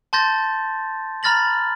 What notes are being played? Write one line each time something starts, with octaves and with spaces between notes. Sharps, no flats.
A5 C6 G6 A6 A#6
A#5 B5 F6 A6 A#6 F#7